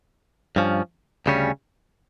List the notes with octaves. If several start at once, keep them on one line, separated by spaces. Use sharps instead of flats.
G2 F3 C#4
D2 C#3 G3 C#4